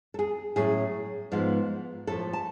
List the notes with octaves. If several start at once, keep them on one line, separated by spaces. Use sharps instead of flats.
A4
G#4
A2 F#3 C#4 G#4
G#2 F3 G#3 B3
A2 F3 A3 A4
A5